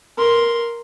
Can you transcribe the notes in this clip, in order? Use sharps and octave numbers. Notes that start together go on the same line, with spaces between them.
A#4 C6